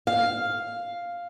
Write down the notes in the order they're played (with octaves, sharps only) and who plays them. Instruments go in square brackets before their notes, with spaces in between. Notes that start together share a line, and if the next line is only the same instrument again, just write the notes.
[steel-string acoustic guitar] F5